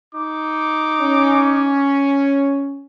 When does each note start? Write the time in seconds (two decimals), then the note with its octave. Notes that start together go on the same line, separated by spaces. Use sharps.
0.14 D#4 D6
1.01 C#4